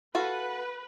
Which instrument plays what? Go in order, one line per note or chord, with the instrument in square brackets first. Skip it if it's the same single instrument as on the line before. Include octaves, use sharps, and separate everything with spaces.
[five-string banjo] F#4 A4 F5 [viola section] B4